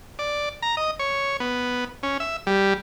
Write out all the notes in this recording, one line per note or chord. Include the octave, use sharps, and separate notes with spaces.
D5
A#5
D#5
C#5
B3
C#4
E5
G3